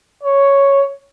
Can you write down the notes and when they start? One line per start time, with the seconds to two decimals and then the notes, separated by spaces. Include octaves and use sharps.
0.23 C#5